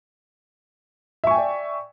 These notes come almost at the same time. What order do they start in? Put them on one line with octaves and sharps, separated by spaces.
E5 C#6 G#5 G5 D5